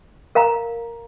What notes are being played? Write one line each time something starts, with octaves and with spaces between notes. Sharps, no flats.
A#4 F5 A#5